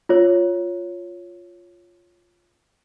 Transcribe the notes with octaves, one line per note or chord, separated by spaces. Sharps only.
F4 C#5